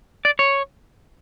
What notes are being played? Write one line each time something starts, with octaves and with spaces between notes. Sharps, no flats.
D5
C#5